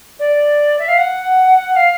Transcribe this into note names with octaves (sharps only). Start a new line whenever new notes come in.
D5
E5
F5
F#5
F5